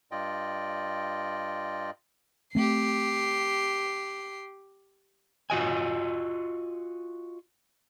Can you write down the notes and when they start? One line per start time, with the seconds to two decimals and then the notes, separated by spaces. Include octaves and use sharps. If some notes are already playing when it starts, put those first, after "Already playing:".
0.12 G2 F4 D5 D#5 G5
2.55 A3 C4 G4 C7
5.50 F4 F#4 D#5 G#5